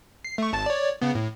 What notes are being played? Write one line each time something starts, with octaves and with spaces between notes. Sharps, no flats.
C7
A3 C#6
G#1 A5 A6
C#5 D5
C#3 B3
A2